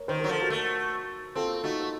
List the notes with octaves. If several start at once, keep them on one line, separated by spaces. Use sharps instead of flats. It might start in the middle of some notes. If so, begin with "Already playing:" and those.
Already playing: A#4 C#5
D#3 C5
F#3 A#4
F3 A4
F#4 A#4
A3
C4 F4 A4
A3 D#4 F#4
F#4